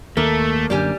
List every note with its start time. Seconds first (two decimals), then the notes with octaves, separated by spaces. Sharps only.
0.17 D#2 A3 A#3 A4
0.70 F#2 D3 G3 G4 G#5